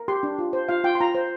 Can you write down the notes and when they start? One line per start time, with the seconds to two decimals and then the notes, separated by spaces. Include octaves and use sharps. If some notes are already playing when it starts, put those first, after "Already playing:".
Already playing: A#4
0.08 G4 C6
0.23 D4
0.39 F4
0.53 C5
0.69 F4 F5
0.84 F4 G5
0.95 C6
1.00 F4 A#5
1.15 C5